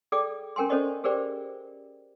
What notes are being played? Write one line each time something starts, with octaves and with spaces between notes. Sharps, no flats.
G#4 A4 D5 G5 D6
C#4 A#4 G5 G#5 C6
C#4 A4 C5 D5 D#5 C#6
G4 G#4 A#4 C5 D5 G5